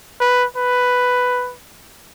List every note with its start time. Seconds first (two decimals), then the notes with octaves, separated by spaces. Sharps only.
0.20 B4
0.56 B4